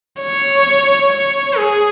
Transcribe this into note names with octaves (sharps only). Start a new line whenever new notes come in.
C#5
C#5
G#4